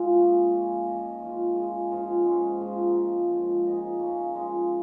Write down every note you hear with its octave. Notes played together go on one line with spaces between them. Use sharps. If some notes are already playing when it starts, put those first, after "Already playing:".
Already playing: A#2 G#3 A#3 D#4 F4
F3 C#4 G#4
F3 C#4 F4 G#4
D#3 A#3 D#4 G#4
F3 G#3 C#4 F4
D#3 G#3 F4 G#4
G#2 F3 G#3 F4
G#2 G#3 C#4 G#4
G#2 F3 A#3 D#4
F3 A#3 D#4 G#4
G#2 F3 G#3 C#4
A#2 G#3 D#4 G#4
C#3 A#3 C#4
F3 G#3 D#4